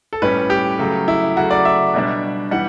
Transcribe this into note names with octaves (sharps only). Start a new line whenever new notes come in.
A4
A2 G3 C#4 B4
G4
C#3 F#3 A3
E4
C#3 F#3 A3 F#4
D5
E5
B2 G3 D4
E3 G3 F#5